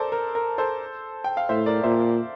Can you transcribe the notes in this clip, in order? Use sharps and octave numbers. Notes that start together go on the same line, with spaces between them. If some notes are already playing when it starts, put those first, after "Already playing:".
Already playing: A4 A#4 C5 D5
A#4
A#4
A4 C5
G5
F5
A2 C5 E5
A#4 D5
A#2 C5 E5